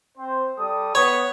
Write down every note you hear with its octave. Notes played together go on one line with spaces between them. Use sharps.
C4 C5
G3 A4 D#6
B3 C#5